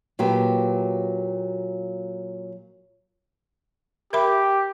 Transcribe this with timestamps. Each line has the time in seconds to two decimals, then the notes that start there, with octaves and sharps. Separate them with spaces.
0.19 A#2 F#3 B3 G4
4.13 G4 A#4 E5 B5